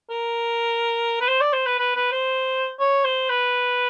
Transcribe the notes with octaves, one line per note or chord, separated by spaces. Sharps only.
A#4
B4
C5
D5
C5
B4
B4
B4
C5
C#5
C5
B4